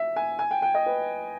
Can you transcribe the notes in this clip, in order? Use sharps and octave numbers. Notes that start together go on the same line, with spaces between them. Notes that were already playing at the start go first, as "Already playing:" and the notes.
Already playing: E5
G#5
G#5
G5
G5
D#5
B4